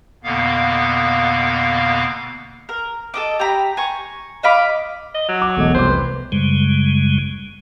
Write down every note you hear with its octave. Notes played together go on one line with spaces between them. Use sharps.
F2 B2 D3 A#3 B3 F5
A#4
A4 D#5 D6
G4 A#5 B5
G#5 A#5 C#6
D#5 F5 B5 D6
D#5
F#3
D6
E1 A3 D#5
C2 F2 C5 D6
B4
F#2 C#3 G3 G#3